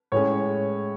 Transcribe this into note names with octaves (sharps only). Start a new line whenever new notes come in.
A2 G#3 C#4 C#5